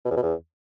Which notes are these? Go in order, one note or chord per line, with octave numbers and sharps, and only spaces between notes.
B2
E2
B2
E2